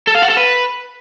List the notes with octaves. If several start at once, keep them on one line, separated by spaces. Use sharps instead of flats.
A4
F5
F#4
A4
B4